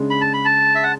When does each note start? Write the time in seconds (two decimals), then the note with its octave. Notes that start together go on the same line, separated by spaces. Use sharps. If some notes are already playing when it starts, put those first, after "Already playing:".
Already playing: C#3 G#3 D4
0.10 B5
0.21 A5
0.34 B5
0.45 A5
0.75 E5
0.83 F#5